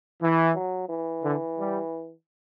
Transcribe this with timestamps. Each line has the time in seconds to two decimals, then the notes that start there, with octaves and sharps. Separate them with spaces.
0.21 E3
0.55 F#3
0.89 E3
1.23 D3
1.58 G3